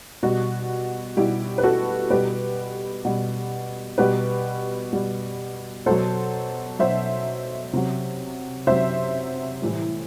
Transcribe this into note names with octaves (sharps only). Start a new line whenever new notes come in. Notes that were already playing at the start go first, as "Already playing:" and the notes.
B2 G3 F#4
B2 G3 E4 G4
B4
F#4 A4
B2 G3 G4 B4
B2 G3
B2 G3 G4 B4
B2 G3
B2 F#3 A4 C5
B2 F#3 C5 E5
C3 F#3
C3 F#3 C5 E5
A2 E3 G3